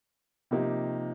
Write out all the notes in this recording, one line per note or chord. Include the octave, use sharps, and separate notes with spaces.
C3 F3 A#3 D#4 G4